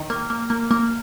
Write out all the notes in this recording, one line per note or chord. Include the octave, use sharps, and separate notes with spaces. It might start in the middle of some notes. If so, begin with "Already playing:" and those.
Already playing: D#3
A#3
A#3
A#3
A#3